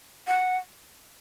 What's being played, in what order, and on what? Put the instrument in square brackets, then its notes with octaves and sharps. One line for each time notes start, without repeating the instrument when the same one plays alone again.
[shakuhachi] F#5